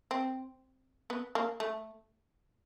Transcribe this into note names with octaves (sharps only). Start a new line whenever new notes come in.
C4
B3
A#3
A3